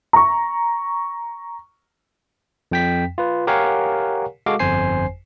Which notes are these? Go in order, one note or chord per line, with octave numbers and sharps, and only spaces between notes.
A#5 C#6
F2 G5 B6
F4 B4
G4 A#4 C#5 F5 F#5 G#5
G#3 F#4 A4 F5 D6
G1 F2 C5 G#5 C7